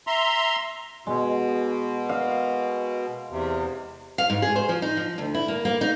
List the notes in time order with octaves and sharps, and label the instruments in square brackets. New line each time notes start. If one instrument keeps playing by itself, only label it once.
[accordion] E5 A#5 C6
[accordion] B2 [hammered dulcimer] G#3
[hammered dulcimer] F5
[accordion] E2 C3
[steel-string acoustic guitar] F5
G#2
G#4
C5
F3
D#4
F3
D2
E4
A#3
A#3
D#4